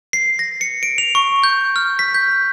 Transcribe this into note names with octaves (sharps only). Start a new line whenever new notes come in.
C7
A#6
C#7
D7
F7
C#6
G6
F6
B6
G6